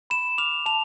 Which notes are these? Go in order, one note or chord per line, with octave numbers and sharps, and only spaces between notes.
B5 E7
D6 F6 F7
A5 F7